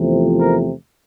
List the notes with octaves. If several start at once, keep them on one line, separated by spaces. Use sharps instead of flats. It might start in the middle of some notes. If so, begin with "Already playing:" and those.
Already playing: E2 C3 F3 A3
A#4